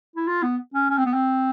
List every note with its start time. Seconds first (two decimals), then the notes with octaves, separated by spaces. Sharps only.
0.16 E4
0.27 F4
0.43 B3
0.74 C#4
0.90 C#4
0.97 C4
1.06 B3
1.14 C4